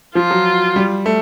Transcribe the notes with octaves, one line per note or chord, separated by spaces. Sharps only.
F3 F4
F#3
G3
A3